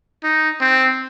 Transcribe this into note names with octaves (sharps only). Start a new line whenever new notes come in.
D#4
C4